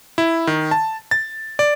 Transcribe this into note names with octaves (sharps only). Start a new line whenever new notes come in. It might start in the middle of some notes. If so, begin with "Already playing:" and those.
E4
D#3
A5
A6
D5